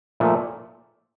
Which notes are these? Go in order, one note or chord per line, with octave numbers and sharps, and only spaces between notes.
A#2 F3 A3